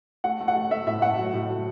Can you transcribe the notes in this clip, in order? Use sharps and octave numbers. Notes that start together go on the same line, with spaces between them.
A3 F#5
A3
F#5
A3
A3 E5
A2 E5
A3 F#5
F#3
A2
F#3